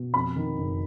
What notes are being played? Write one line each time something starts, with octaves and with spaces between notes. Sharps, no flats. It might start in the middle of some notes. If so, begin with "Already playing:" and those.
Already playing: B2
F2 B5
D#3
F#1